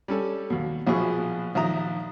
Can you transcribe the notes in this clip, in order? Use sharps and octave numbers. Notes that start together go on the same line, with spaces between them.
G3 C#4 A4
D#2 B2
A#1 B2 F3 E4 G#4 C#6
A#1 D#3 E5 A#5 D#6